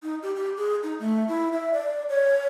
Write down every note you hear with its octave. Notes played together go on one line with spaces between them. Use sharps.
D#4
G4
G4
G#4
D#4
A3
E4
E5
D5
C#5